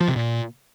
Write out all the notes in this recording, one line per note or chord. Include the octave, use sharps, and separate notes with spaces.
F3
C3
A#2